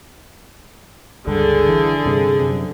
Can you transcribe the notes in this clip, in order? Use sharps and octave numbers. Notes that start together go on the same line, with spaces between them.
G1 C#2 G2 D3 G#4
E3
G2 C3
F#2 C3